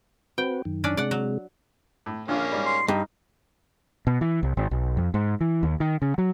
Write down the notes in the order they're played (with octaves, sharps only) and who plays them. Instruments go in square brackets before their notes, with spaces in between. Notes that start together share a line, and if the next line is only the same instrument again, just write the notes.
[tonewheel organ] C4 F#4 B4 [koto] G5
[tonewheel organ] F#2 D#3
[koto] C#4 D4 D5
[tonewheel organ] C3 G#3 [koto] D5 F#5
[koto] F#3
[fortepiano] A2
[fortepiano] A#1 D3 F4 [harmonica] A#3 C#4 G#4
[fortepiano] G#2 G3
[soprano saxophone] C6
[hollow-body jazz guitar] G2 [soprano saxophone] D#4
[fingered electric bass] B2
E3
C2
G#1
B1
F2
G#2
E3
D#2
D#3
C#3
F#3